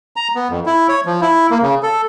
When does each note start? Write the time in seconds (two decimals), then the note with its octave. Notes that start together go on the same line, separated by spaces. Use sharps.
0.16 A#5
0.35 B3
0.49 F2
0.66 E4
0.89 C#5
1.06 F3
1.22 E4
1.51 A#3
1.62 C#3
1.83 A4